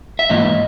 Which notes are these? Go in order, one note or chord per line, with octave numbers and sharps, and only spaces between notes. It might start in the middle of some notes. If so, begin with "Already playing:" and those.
E5
G#2 E3 A#3 D#5